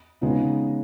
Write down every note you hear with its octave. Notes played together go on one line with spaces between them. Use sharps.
C#3 G#3 B3 D#4